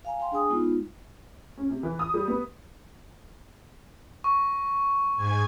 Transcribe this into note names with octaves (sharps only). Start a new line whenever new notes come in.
F5 G#5 A#5
F5 G5 C6
D4 G#4 G#5 D#6
G#3 B3 D#4 F4
C#4
C3
E3
D#6
G3
B3
C#6
G#2 G#5 G#6